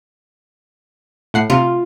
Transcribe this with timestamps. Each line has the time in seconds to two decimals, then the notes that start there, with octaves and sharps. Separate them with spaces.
1.34 A2 F#5 C7
1.50 C3 F4